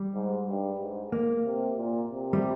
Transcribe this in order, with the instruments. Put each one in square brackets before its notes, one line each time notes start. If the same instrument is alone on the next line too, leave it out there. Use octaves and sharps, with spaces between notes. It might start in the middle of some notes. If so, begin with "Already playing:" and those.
Already playing: [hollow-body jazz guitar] G3
[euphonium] G#2
G2
G#2
[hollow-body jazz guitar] A#3
[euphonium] C3
A#2
C3
[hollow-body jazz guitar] G3